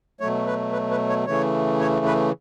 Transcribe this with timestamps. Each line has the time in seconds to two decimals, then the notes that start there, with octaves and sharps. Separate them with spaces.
0.20 B2 F#3 A3 C#5
0.47 B4
0.73 B4
0.91 B4
1.09 C#5
1.26 C#3 E3 A3 C#5
1.80 C#5
2.05 B4